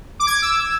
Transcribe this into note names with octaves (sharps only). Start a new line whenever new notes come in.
D6
G#6
D6
E6